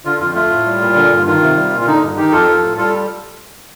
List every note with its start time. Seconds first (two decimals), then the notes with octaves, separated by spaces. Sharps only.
0.05 D3 F4
0.20 F2 F4
0.35 A3 F4
0.50 A2
0.66 G3
0.81 A#2
0.95 D3
1.10 G2
1.26 D#3 F4
1.42 C3
1.56 G3
1.72 A#2
1.81 F4
1.86 D3 D#4
2.01 G2
2.17 D#3 D#4 G4
2.32 F2 F4 A4
2.47 F3
2.63 A2
2.77 G3 F4 A4